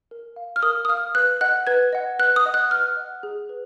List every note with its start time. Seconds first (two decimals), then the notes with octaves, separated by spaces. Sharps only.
0.11 A#4
0.36 F5
0.56 F6
0.62 A#4 D#6
0.85 D#6
0.89 F5 F6
1.15 B4 F#6
1.41 D#5 F#5 F#6
1.67 B4 G#6
1.93 D#5 F#5
2.19 B4 F#6
2.36 D#6
2.46 D#5 F#5
2.54 F#6
2.71 B4 F6
2.97 D#5 F#5
3.23 G#4
3.49 B4